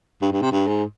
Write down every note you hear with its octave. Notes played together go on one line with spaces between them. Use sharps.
G2
G2
C3
G2
G#2